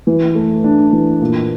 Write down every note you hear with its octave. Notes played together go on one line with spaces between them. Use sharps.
E3
A3
D4
E3
A#2